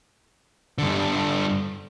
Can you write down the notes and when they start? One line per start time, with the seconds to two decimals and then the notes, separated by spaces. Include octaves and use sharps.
0.78 G2 D3